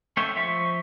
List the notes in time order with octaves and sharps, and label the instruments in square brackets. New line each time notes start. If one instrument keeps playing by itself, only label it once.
[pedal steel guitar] A3 C#4 C#5 E5 G5
F3 E5 C#6